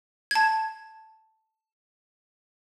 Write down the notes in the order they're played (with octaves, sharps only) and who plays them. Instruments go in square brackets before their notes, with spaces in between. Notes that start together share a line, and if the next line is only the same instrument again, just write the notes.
[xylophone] A5 G#6